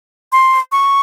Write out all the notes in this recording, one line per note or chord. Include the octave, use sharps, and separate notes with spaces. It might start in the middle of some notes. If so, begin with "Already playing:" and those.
C6
C#6